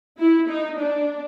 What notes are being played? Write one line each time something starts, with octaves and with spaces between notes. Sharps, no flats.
E4
D#4
D4